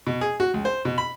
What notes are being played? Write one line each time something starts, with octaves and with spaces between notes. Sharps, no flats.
B2
G#4
F#4
C#2
C5
B2
B5